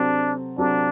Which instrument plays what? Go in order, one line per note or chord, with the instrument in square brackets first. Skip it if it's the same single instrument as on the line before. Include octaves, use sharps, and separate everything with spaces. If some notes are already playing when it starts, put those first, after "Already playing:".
Already playing: [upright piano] C3 F#3 C4 F#4 A4 [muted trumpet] D4
[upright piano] C3 F#3 C4 F#4 A4 [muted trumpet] D4